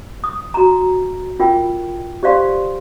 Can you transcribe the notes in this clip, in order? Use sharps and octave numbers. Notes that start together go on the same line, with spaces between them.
D#6
F#4 A#5
F4 A#4 G5
G4 C5 D5 F5 C6